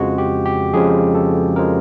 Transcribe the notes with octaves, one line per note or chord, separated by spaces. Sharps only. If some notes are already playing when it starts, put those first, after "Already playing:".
Already playing: F2 C#3 F3 G#3 F#4
G4
G4
F2 C#3 F3 G#3 G#4
A4
C#3 F3 G#3 A#4